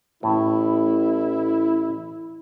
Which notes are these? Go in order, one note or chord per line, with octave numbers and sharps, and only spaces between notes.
A1 A2 E4